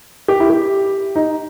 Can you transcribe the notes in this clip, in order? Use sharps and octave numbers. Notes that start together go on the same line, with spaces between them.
G4
E4
G4
D#4